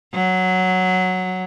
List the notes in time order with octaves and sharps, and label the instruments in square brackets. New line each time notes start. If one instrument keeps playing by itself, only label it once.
[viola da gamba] F#3